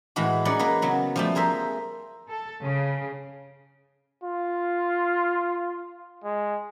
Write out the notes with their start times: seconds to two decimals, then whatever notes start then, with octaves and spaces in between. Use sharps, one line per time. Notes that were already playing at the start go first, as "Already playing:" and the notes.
0.16 A2 E3 G#3 F#4
0.45 C#4 D#4 G#4 B4 D5 F#5
0.59 A#3 A#4 B4 D#5
0.82 C#3 F#3 B3
1.16 F3 G3 A3
1.35 G#4 A#4 C5 E5
2.29 A4
2.63 C#3
4.23 F4
6.24 G#3